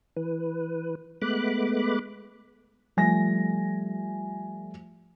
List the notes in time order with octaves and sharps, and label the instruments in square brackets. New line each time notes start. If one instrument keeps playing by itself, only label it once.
[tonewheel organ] E3 B4
G#3 A3 B3 B5 D6 F#6
[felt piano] F3 G3 A3 G#5 A#6